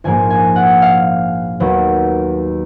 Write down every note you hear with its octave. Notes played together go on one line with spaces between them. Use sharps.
A#1 G#2 F3 A#3 G#5
G#5
F#5
F5
D#2 D#3 F#3 B3